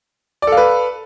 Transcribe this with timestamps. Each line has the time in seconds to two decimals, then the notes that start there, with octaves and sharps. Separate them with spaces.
0.42 D5
0.47 A4
0.52 F5
0.57 B4